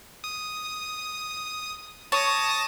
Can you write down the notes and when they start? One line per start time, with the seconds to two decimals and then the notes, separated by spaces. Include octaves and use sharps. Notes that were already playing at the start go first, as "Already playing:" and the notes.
0.24 D#6
2.12 C#5 A5 D#6 A#6